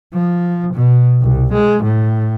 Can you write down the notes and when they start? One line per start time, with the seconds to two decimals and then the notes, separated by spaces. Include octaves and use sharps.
0.13 F3
0.74 B2
1.22 C2
1.53 G#3
1.84 A2